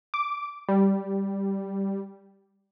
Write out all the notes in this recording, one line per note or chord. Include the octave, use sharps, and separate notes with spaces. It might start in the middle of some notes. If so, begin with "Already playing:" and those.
D6
G3